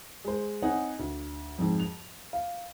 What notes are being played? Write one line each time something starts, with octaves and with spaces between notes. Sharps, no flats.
G#3 C5
C4 D#4 C#5 F#5 G#5
D2
F2 G#2
F7
F5